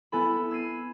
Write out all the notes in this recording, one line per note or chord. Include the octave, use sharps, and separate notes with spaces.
B3 E4 A4 G#5 B5
E6 G#6 C7 D#7